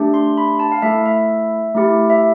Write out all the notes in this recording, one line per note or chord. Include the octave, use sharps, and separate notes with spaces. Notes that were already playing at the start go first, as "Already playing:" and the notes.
Already playing: A3 D4 G4
C6
B5
A5
F5
A3 E4 A4 E5
E5
A3 E4 G4
E5